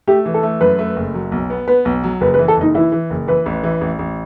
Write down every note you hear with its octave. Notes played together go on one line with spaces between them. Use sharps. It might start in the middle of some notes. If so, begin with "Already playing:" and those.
A3 G4
E3
A4
A3
F#2 B4
A3
F#1
F#3
B1
B3
B3 B4
B1
F#3
F#1 B4
B4
E3
A4
F#1 D#4
E3 E4
E3
F#1
E3 B4
A1
E3
A1
A1